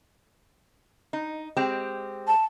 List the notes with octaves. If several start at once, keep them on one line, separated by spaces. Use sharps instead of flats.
D#4
G#3 C4 G4
A5